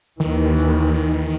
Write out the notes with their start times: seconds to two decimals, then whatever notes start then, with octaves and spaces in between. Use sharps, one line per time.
0.20 D#2 D#3 E3